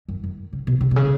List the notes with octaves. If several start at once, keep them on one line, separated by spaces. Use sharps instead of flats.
F#2
F#2
C#3
B2
C#3
B2
C#3